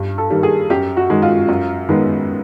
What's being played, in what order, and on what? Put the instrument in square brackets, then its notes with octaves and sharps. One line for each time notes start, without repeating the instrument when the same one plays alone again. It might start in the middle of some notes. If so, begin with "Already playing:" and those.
Already playing: [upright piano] G2
A4
D#3 G3 A#3
G#4
F#2 G4
F#4
D#3 G#3
F4
F#2
D#3 G#3 B3